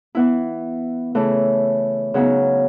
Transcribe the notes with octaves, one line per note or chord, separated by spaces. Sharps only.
E3 B3 E4
C#3 E3 A3
C#3 F#3 B3 D#4